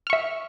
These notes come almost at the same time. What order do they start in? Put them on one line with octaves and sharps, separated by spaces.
F6 C#6 E5